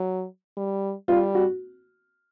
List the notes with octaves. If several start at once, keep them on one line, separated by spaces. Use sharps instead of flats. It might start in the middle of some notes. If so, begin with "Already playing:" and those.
Already playing: F#3
G3
G3 F4
F#4